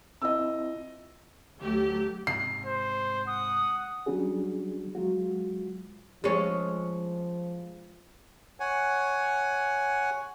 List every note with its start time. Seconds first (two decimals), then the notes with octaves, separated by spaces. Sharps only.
0.22 C4 E4 F4 D#5 E6
1.59 D2 F#3 A3 G4
2.27 G#2 C3 C7
2.66 C5
3.27 F#5 D#6
4.06 F#3 G3 C#4 D4 F#4 G#4
4.95 F#3 G#3 F4 F#4
6.24 F3 G#3 C#4
8.60 C#5 F#5 G#5